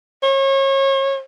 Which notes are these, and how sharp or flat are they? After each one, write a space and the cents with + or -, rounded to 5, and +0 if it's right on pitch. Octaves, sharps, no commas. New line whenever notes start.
C#5 -35